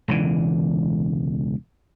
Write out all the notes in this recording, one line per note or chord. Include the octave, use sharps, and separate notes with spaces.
E1 C#2 D3 E3